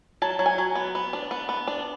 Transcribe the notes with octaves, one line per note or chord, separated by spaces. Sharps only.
F#3 A5
F#3
G#5
F#3
B3
B3
D4
B3
B3
D4